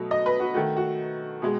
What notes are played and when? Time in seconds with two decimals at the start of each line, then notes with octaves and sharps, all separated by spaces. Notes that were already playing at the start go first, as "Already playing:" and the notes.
Already playing: B2 F#3 A3
0.11 D#5
0.26 B4
0.40 F#4
0.54 D#3 A3 F#4
0.77 F#4
1.42 B2 G#3